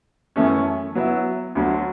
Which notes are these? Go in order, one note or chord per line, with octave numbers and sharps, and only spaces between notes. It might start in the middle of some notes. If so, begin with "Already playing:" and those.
F#2 E3 A3 C#4
F#3 B3 E4
D2 D3 F#3